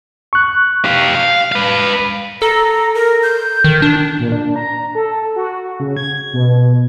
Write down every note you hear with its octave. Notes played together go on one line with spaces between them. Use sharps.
C#6 F#6
G4 F5
F5
B4 F5
A4 A#5
A#4
G6
D#3
D4
A#2
D4
A#5
A4
F#4
C#3
G#6
B2